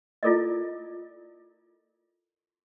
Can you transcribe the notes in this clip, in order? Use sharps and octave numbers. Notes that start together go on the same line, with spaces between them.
E4 F4 A4 A#4 D5 D#5